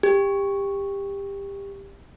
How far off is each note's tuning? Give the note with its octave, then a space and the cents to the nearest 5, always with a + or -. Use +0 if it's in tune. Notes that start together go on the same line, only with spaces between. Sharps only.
G4 +20